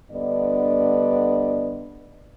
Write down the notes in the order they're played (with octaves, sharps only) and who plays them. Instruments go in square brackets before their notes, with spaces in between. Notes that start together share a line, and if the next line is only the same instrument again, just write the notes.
[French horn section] G2 D3 B3 D4 D5 D#5